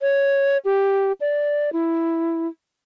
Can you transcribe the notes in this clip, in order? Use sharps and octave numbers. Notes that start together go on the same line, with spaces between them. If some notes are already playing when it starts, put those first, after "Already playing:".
C#5
G4
D5
E4